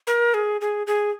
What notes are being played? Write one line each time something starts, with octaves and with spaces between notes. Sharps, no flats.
A#4
G#4
G#4
G#4